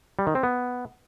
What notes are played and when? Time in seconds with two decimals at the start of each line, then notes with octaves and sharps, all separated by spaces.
0.19 G3
0.27 D#3
0.35 C4
0.43 B3